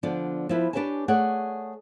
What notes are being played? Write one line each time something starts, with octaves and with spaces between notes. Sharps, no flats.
D3 F3 B3 D4 D5
F3 E4 B4
D4 G4 B4 C#5 G#5 A5
A3 G#4 C#5 D5 F#5